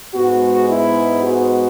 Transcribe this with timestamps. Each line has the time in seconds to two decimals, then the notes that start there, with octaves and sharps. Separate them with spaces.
0.15 G#2 G#3 B3 F#4
0.70 E4
1.23 F#4